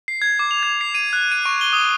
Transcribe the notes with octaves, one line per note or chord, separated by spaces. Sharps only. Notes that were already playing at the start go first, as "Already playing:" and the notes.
C7
G#6
D6
F7
G#6
C7
D#7
F#6
D#7
C#6
G7
D#6